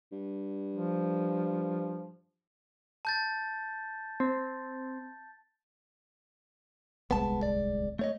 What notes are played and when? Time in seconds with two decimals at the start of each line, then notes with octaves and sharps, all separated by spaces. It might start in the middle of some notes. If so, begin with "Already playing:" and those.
0.12 G2
0.76 F3
3.05 A5 G6 A6
4.20 C4
7.11 D1 C2 G#3 B3 A5
7.43 D5
7.99 A3 C#5 D#5